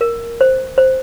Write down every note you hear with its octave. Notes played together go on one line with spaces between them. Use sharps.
A#4
C5
C5